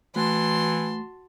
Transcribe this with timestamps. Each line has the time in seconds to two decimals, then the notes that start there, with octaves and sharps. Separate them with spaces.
0.16 E3 A3 F#4 A5 C6